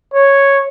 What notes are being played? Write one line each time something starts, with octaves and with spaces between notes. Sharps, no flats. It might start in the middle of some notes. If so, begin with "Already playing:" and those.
C#5